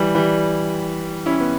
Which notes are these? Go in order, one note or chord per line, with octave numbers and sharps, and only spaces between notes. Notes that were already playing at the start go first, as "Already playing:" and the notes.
Already playing: E3 G3
E3 G3
C#4 E4
B3